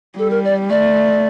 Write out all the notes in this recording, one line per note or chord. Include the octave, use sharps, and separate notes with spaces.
G3 A4
A#4
D5
A3 D5